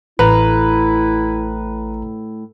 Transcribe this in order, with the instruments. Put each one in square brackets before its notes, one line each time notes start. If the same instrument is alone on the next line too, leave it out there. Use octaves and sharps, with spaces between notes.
[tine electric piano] A1 A#5 [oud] A2 [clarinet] E4 [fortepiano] B4